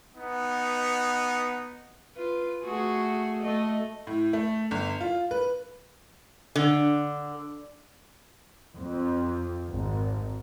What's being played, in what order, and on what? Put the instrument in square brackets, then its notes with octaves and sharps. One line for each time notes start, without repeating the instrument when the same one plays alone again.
[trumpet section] B3 D#4
[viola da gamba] F4 B4
A3 F#4 G#4
A3 D#5
[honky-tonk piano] A2
A3
G1
F4
B4
[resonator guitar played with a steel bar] D3
[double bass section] F2
G#1